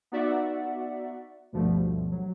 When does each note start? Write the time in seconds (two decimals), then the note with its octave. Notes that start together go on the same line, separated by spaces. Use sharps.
0.12 B3 D#4 F#4 D5 E5 F#5
1.52 D2 G2 B2 F3 G3 A3
2.12 F#3